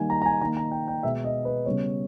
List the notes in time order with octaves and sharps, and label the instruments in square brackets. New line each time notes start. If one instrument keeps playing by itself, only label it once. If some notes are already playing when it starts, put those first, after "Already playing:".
Already playing: [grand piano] D#3 G3 A#3 G#5
A#5
A#5
G#5
D#3 A#5
A#3
A#5
G5
G5
B2 G#3 B3 E5
D#5
B4
C#3 G3 B3 C#5